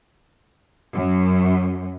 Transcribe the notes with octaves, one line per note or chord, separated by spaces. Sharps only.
F#2